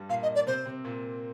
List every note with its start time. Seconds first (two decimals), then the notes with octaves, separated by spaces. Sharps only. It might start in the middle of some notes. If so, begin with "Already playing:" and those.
Already playing: G2 G3
0.09 A#2 A#3 F5
0.23 D#5
0.35 D5
0.47 C3 C4 C5
0.66 C3 C4
0.84 A#2 A#3